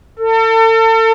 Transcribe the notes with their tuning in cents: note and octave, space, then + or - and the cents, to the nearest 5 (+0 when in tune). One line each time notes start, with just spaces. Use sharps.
A4 +35